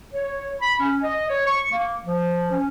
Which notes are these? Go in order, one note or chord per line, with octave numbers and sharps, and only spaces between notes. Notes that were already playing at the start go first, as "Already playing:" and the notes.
C#5
B5
C#4
D#5
C#5
C#6
A#3
F3
C#4